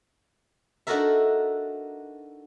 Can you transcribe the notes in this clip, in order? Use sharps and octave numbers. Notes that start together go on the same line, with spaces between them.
D4 D#4 F#4 A4 A#4 E5